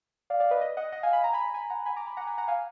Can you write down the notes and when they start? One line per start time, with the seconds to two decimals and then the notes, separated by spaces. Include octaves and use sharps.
0.30 D5 F5
0.40 D5 F5
0.51 B4 D#5
0.61 B4 D#5
0.77 D#5 F#5
0.92 D#5 F#5
1.03 F5 G#5
1.13 B5
1.24 A#5
1.33 G#5 B5
1.54 G#5 B5
1.70 F#5 A#5
1.86 G#5 B5
1.96 A#5 D6
2.06 G#5 B5
2.17 F#5 A#5
2.27 G#5 B5
2.38 F#5 A#5
2.48 F5 G#5